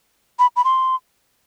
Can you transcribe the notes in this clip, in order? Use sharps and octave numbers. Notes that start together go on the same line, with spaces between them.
B5
B5
C6